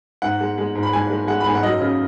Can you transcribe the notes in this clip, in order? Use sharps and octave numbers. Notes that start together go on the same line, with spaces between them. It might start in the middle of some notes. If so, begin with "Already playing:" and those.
G#2 F#5
G#3
G#3
G#2
B5
G#2 G#5
G#3
G#3 F#5
B5
G#2 G#5
F#5
F#2 D#5
C#3